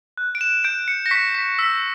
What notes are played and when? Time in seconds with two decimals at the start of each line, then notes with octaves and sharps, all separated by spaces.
0.18 F#6
0.35 D7
0.41 E7
0.64 G6 D7
0.88 C#7
1.06 A#6
1.11 C#6 B6
1.35 B6
1.59 E6 B6